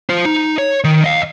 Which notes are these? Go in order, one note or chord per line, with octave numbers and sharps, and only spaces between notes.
F4 C5
D#4
C#5
D#3
D#5 F5